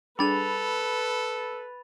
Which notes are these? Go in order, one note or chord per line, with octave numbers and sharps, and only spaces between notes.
G3 D4 G#4 A4 B4 B5 A6 F7